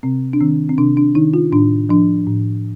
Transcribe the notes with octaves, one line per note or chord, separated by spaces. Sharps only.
C3 C4
D4
D#3 C4
C4
C3 D4
D4
D#3 D#4
F4
A2 D4
F3 D4
A2